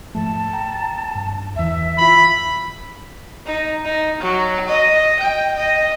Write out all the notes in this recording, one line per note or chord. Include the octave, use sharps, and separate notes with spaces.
G#2 F3 A3 A5
G5 A#5
G2
E2 E3 E5
E3 F4 B5
D#4
D#4
F#3
D#5
G5
D#5